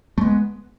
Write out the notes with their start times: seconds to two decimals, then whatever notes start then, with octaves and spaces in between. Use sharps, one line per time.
0.18 A3
0.21 G#3
0.25 B3